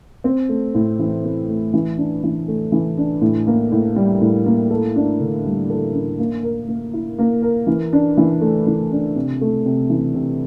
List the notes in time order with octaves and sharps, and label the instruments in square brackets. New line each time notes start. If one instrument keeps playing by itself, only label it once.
[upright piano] C4
A3
A2
E3
C4
A3
E3
D4
E3
A3
E3
D4
A2
A#3
A2
G3
A2
A#3
A4
D4
D3
G3
A4
D4
A#3
A#4
A#3
E4
A#3
A#4
E3
D4
E3
A3
E3
D4
C3
A3
C3
E3
C3